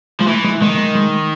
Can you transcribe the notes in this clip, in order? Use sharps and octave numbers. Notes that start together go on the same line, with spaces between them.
F3 G#3
E3 A3
G#3
D#3 G#3
G#3
G#3